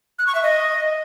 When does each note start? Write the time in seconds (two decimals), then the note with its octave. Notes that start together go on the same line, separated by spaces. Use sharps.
0.19 F#6
0.27 C#6
0.35 E5
0.43 D#5